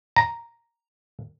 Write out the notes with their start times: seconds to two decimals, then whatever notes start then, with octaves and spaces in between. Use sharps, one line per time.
0.16 A#5